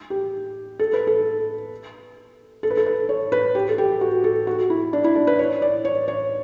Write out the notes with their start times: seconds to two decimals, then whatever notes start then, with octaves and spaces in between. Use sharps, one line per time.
0.10 G4
0.79 A4
0.93 B4
1.07 A4
2.63 A4
2.70 B4
2.77 A4
2.86 B4
3.09 C#5
3.32 B4
3.55 G4
3.69 A4
3.78 G4
4.01 F#4
4.24 A4
4.47 F#4
4.70 E4
4.93 D4
5.04 E4
5.16 D4
5.27 B4
5.39 C#5
5.62 D5
5.85 C#5
6.08 C#5